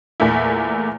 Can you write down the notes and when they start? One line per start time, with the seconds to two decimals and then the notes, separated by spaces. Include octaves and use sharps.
0.20 E2 A#2 A3 E4